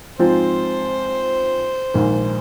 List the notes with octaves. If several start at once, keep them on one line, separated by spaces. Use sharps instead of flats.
G#2 F3 C4 F4 C5
A#1 G#2 D#3